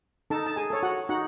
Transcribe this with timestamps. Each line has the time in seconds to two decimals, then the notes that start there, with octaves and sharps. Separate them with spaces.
0.30 D#4 A4 A5
0.46 A5
0.56 G#4 G#5
0.70 A4 C#5
0.83 F#4 F#5
1.09 D#4 F#4 F#5